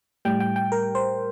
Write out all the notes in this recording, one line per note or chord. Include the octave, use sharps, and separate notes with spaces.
A2 G3 G5
G5
G5
A#4
C5